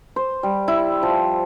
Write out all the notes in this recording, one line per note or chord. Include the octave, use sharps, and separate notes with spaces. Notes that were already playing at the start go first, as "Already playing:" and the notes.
C5
G3
E4
F3